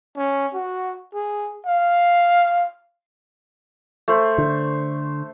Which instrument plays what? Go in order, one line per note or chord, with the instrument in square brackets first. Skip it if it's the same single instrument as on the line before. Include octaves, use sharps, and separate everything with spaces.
[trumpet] C#4
F#4
G#4
F5
[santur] A3 C5
[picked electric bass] D3